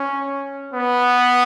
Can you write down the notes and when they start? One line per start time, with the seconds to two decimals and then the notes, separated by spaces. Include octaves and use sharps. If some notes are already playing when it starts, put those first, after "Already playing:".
Already playing: C#4
0.74 B3